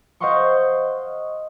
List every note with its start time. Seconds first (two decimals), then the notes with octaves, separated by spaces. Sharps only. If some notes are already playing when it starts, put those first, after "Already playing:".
0.20 C5 D#5 F5 F#5 C6 C#6